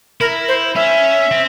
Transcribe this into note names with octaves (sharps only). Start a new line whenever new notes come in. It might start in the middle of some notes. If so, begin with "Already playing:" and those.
E4 A#4
C5
C#4 E5
C4